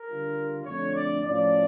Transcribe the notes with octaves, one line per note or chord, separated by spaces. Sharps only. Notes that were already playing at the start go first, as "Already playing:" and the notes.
Already playing: A#4
D3 G3 D4 F4
F2 D3 A3 D4 C#5
D5
A2 F3 C#4 D5